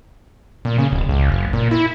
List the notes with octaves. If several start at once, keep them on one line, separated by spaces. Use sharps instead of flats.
A#2
C#3
D1
C#2
F#1
A#2
E4